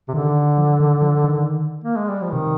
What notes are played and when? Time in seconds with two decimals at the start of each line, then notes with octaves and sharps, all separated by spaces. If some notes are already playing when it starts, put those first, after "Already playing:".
0.08 C3
0.14 D3 D#3
0.58 F3
0.80 D#3
1.02 F3
1.24 D#3
1.84 A#3
1.96 G#3
2.09 G3
2.21 F3
2.33 C3 D#3